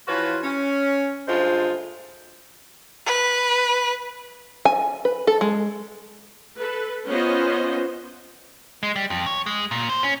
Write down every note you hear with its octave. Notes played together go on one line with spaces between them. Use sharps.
E3 F3 F4 F#4 B4 C#5
C#4
D2 G2 G#3 A3 F4 C5
B4
G#5
B4
A4
G#3
A4 B4
B3 C#4 F4 C5 D#5
G#3
G3
F2
C#5
G#3
A#2
C5
C#4